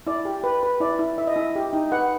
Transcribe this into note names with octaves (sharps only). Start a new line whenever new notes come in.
E4 D5
G4
B4
B4
E4 D5
E4
E4 E5
D#5
E4 E5
G4
D#4
B4 F#5